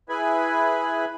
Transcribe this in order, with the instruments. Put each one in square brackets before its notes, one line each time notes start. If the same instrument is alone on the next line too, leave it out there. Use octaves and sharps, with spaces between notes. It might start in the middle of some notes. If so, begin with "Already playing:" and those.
[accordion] E4 G#4 B4 G#5 B5